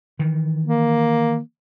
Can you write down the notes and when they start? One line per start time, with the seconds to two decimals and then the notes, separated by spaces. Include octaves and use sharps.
0.19 D#3 E3
0.65 A#3